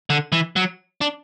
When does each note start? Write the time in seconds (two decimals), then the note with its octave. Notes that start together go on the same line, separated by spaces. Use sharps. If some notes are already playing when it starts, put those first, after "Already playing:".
0.10 D3
0.32 E3
0.56 F#3
1.01 D4